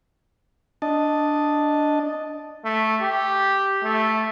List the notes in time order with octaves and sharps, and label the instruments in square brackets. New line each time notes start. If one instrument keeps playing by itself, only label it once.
[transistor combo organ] D4 D#5 A5
[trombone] A3
G4
A3